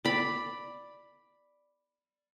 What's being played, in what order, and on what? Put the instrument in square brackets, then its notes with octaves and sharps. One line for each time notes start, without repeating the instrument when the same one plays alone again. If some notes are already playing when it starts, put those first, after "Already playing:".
[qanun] D5 B5